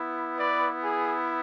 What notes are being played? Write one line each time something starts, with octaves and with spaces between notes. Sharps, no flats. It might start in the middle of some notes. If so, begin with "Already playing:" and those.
Already playing: B3 E4
B4 D5
G#4